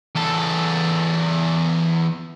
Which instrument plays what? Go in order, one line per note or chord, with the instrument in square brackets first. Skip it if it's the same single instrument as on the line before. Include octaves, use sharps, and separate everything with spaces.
[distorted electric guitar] E2 A4